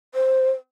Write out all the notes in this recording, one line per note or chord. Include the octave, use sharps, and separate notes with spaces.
C5